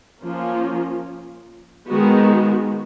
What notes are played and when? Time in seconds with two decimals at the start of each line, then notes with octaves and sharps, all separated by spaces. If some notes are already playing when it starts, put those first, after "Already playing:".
0.23 F3 A#3 C#4 F4
1.88 D#3 G#3 B3 F#4